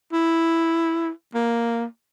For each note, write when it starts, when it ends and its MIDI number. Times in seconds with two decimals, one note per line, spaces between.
0.12 1.10 64
1.34 1.84 58